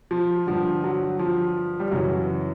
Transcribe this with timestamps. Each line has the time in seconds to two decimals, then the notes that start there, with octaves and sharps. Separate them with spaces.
0.11 F3
0.47 G2 D3 F3
0.84 F#3
1.19 F3
1.80 G3
1.92 F#2 C#3 E3 F#3